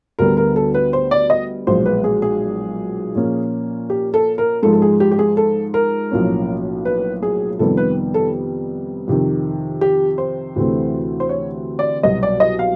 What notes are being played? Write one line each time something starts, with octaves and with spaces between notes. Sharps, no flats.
D2 D3 G3 B3 A#4
A#4
A4
B4
C5
D5
D#5
B1 A#2 F3 G#3 C5
B4
G#4
G#4
A#2 F3 A#3 C#4
G4
A4
A#4
G#2 F3 G#3 A4
A4
G#4
G4
G4
G#4
A4
A#4
B1 A2 F3 A#3 C#4
B4
G#4
F2 C3 D#3 G3 B3 A4
B4
A4
F2 C3 D#3
G4
C5
D2 C3 E3 A3 C4
C5
C#5
D5
C2 B2 F#3 D#5
D5
D#5
F5